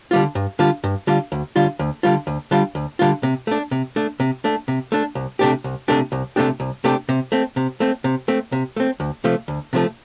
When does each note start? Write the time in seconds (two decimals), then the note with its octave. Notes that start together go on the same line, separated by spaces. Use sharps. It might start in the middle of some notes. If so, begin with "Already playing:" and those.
0.11 D3 G3 F4
0.35 G2
0.59 D3 G3 F4
0.84 G2
1.07 D3 G3 F4
1.32 D2
1.56 D3 G3 F4
1.79 D2
2.03 D3 G3 F4
2.27 D2
2.51 D3 G3 F4
2.75 D2
2.99 D3 G3 F4
3.23 C3
3.47 A3 D4
3.71 C3
3.96 A3 D4
4.20 C3
4.44 A3 D4
4.68 C3
4.92 A3 D4
5.15 C2
5.39 C3 A3 D4 G4
5.64 C2
5.88 C3 A3 D4 G4
6.12 C2
6.36 C3 A3 D4 G4
6.60 C2
6.84 C3 A3 D4 G4
7.09 C3
7.32 A3 C4
7.56 C3
7.80 A3 C4
8.04 C3
8.28 A3 C4
8.52 C3
8.76 A3 C4
9.00 D2
9.24 C3 F3 A3
9.48 D2
9.73 C3 F3 A3